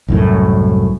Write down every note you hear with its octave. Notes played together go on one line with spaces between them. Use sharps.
C2 F#2 A2